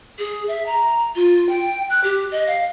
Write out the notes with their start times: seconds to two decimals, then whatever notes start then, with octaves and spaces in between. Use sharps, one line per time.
0.19 G#4
0.48 E5
0.66 A#5
1.16 F4
1.49 G5
1.90 F#6
2.04 G4
2.32 D#5
2.47 F5